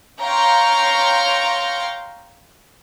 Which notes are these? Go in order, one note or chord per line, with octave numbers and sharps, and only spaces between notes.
C#5 F5 G5 A#5 C6 C#6